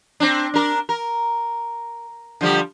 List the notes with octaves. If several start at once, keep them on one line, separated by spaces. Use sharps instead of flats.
C4 D4
D4 A#4
A#4
D3 F3 G3